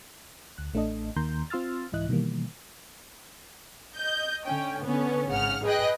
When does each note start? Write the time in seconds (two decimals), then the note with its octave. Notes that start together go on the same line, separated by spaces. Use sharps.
0.58 D2 F#6
0.74 A1 A3 D4 A4 D#5
1.16 D#2 D#3 A#3 A#5 C6 G6
1.50 C4 F4 C6 E6 F6 A6
1.92 C2 G#2 E3 E4 D#5 F#6
2.09 B2 D#3 E3 G3 A#3
3.95 D#5 G6
4.44 D3 C#4 G5
4.84 D3 B3 C#4
5.29 G#1 C#3 F#5 F6
5.63 G#4 B4 D#5 G5 F#6